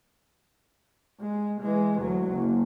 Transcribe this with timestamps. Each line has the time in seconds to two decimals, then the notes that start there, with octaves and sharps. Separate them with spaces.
1.21 G#3
1.61 E3 G#3
2.00 D2 F#3
2.33 F#1